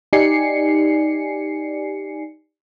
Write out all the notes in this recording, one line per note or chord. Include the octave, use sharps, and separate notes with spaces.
D#4 G4 D5 G#5 C7 C#7